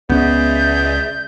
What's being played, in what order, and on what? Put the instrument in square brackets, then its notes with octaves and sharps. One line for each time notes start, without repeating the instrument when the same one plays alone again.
[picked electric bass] C#2 C#4 [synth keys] B3 [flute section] G#4 D5 E5 [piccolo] G6